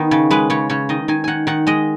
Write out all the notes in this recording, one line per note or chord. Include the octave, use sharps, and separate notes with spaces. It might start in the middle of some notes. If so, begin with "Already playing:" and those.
Already playing: D#3 B3
C#3
G#3 B4
C#3 C#5
C#3 C#5
D#3 D#5
D#3 G#5
D#3 F#5 G#5
D#3 F#5
G#3 D#5